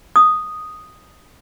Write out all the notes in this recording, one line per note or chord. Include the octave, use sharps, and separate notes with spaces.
D#6